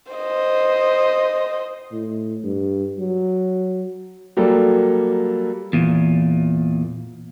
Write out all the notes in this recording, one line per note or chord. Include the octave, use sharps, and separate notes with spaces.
C5 D#5
A2
G2
F#3
F#3 G3 A#3 A4
E2 A#2